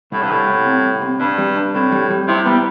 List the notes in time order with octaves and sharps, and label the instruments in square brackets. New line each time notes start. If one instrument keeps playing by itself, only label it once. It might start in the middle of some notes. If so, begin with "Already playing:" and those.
[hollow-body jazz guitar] C2 [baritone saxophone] A2
[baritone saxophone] G2
[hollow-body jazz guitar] C2 [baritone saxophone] A2
[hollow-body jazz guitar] C2
C3
C2
C3
[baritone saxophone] G2 [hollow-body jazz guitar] D4
[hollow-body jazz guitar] G3
D4
[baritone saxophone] A2 [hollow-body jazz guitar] C3
[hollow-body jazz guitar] G3
G3
[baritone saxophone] C3 [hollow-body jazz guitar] E4
[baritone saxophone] G3 [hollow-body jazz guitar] B3